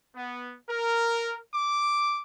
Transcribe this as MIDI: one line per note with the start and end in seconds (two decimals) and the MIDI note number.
0.15 0.55 59
0.67 1.38 70
1.54 2.21 86